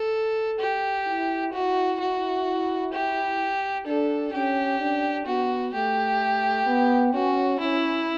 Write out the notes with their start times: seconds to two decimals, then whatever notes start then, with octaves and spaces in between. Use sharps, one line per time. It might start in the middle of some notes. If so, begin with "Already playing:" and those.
Already playing: A4
0.60 G4
1.06 E4
1.53 E4 F#4
2.00 F#4
2.93 G4
3.86 D4 A4
4.33 C#4 G4
4.80 D4
5.26 B3 F#4
5.73 A3 G4
6.67 B3
7.14 C#4 F#4
7.60 C#4 E4